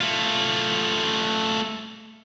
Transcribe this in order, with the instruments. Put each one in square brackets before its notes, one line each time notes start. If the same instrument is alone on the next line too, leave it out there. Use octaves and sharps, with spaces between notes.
[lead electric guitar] A3 F4